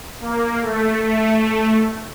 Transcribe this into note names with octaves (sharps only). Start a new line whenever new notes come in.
A#3
A3
A3